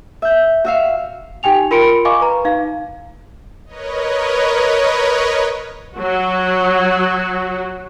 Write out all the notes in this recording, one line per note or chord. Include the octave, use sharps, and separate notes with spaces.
E5 G6
F#4 E5 F5
D#4 G4 G5 G#5 F7
F4 A#4 B5 C6 C#7 D7
D#5 F5 G#5 C#6 D6
B4 A#5
D#4 F5
A#4 B4 C#5 D#5
F#3 F#4